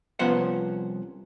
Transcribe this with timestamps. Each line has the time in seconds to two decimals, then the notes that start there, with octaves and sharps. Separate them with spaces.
0.19 C2 F3 B3 C#4 C5 F#5